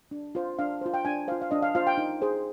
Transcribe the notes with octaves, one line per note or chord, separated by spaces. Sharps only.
D4
F4 C5
D4 F5
F4 C5
G5
D4 G#5
F4 C5 F5
F5
D4 D#5
F5
F4 C5 F5
G5
D#4
G#4 C5